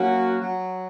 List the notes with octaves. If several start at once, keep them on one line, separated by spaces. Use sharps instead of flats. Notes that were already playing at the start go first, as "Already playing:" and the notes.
Already playing: F#3 A#3 C#4 F#4
F#3